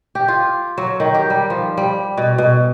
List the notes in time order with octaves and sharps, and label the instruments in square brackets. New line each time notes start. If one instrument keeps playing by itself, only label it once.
[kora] G4
F4
F#3
D#3
G4
G3
F3
G3
B2
B2